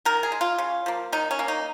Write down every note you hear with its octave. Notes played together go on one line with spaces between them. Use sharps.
D#3 A#4
G#4
G#3
F4
C#3
F3 A#3
D#3 D#4
C#4
A#3
D#4